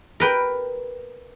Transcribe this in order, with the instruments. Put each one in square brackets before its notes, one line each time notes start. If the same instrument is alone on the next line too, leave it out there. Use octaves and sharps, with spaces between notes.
[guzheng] A#4 B4 G5